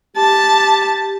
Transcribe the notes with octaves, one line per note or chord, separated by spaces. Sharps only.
G4 A5